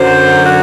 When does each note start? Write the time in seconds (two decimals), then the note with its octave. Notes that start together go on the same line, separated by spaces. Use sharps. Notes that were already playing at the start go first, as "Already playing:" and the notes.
Already playing: F#2 D3 F#3 C5
0.45 F#4